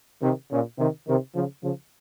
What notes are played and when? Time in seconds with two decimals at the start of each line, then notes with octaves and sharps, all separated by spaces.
0.22 C3 D#3
0.51 A#2 C#3
0.79 C3 D#3
1.08 C3 D#3
1.35 C#3 F3
1.63 C#3 F3